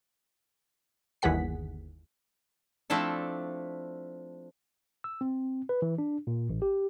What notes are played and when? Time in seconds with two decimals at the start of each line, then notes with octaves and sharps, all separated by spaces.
1.22 G1 D#2 E3 G#4 F#5 B6
2.90 F3 A3 C4 D4 E4 A4
5.04 E6
5.21 C4
5.69 B4
5.82 E3
5.98 D4
6.27 A#2
6.49 A1
6.62 G4